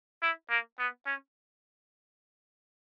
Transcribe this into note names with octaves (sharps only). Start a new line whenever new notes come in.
E4
A#3
B3
C#4